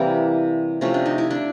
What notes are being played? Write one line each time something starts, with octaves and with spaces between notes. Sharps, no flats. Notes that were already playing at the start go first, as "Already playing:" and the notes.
Already playing: C3 E3 G3 A#3 C4
C3 F3 A3 C#4
D4
D#4
E4
D4